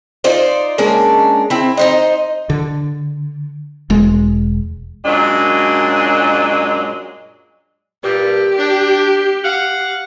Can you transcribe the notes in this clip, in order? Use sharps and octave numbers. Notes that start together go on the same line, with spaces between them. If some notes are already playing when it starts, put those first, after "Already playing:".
D#4 F4 C5 D5
G#3 A#3 C#4 D4
C4 E4
D#4 C5 D#5
D3
E1 G#3
F#2 A#2 F#3 G#3 D4
G2 A#2 G4
D4
F5 F#5